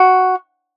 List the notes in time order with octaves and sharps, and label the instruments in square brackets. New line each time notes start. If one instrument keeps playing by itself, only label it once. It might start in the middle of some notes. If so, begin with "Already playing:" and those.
Already playing: [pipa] F#4